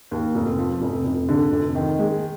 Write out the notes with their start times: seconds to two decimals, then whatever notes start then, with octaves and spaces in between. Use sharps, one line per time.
0.11 D#2
0.35 F1
0.58 F3
0.81 F1
1.05 F1
1.29 D3
1.52 F1
1.75 D#3
1.99 G#3